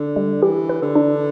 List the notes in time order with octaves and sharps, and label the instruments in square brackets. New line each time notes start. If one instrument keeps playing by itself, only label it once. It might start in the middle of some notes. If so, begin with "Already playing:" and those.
Already playing: [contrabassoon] D3
[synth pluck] G3
[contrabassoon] E3 [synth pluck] G4
[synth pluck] B4
[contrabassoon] D3
[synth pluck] D4